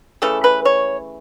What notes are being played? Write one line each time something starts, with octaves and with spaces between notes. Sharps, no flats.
C#3 E3 A3 A4
B4
C#5